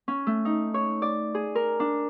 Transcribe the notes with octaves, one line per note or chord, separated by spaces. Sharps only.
C#4
A3
D#4
C#5
D5
G#4
A#4
D4